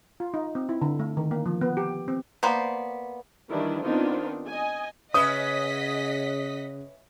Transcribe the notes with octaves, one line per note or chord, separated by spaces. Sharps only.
F4
D#4
C4
E4
D3
A3
D#3
A#3
F3
B3
G4
C4
A#3 B3 C5 D5
D#3 E3 G3 D4 E4
D#3 B3 C4 D4 D#4 F4
D#5 G#5
C#3 C#4 B4 D#5 E5 F#5 D#6 B6